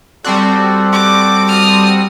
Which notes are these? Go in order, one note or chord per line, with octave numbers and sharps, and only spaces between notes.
G3 C4 F#4 A4 D5
D6
D#6 F6